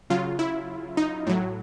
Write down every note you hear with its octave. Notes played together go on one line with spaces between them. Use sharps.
C#3 F#3 F4
E4
D#4
A2 F#3